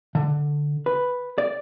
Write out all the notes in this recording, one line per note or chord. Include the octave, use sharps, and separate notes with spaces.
D3
B4
D5